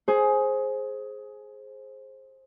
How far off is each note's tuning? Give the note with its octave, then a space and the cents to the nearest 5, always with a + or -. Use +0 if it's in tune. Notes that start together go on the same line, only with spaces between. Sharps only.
G#4 +15 C5 +15